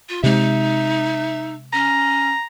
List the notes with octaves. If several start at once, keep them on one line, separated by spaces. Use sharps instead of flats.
F4
C3 G#3 D#4 E5
C#4 A#5